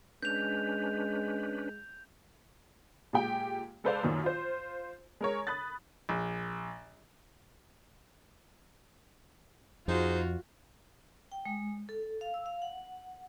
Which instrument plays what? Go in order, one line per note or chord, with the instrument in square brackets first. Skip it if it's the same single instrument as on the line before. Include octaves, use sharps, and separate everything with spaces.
[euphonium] G#3 [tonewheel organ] C#4 D4 B4 [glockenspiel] G6 F7
[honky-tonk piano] A#2 G#3 G4 G5
G#3 A4 B4 C5 D5 F5
F#2 A#2 D#3
F4 C5
G#3 A#4 C#5
B5 D#6 F#6 A6
[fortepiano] A#1
[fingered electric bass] F2 [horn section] D#4 G#4 C5 [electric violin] F4 F#4
[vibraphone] G5
G#3
A4
F5
E6
F5
F#5